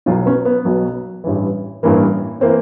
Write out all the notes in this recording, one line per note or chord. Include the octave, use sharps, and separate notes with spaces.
B1 B2 F#3 D#4 F4
B3 C#4
B3
B1 B2 F#3
A1 G2 E3
A1 G2 E3 A#3
E3 A#3 C4